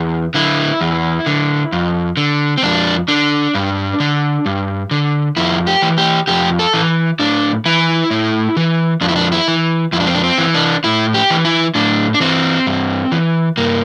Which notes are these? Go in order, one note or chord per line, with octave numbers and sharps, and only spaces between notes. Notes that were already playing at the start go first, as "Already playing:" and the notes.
Already playing: E2
D3 E4
E2
D3
F2
D3
C4
F2 D4
D3 D4
G2
D3
G2
D3
F2 E4
G4
E3
G4
F2 G4
A4
E3
A2 D4
E3 E4
A2
E3
F2 D4
E4
D4
E4
E3
F2 E4
D4
C4
D4
C4
E3
D4
A2 E4
G4
E3
E4
A2 D4
D4
E3 C4
G2
E3
G2 A#3